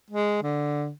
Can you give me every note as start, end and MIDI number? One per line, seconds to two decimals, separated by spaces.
0.11 0.39 56
0.42 0.91 50